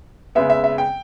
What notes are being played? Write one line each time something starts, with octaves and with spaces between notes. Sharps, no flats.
C#3 G#3 B3 E5
E5
E5
G5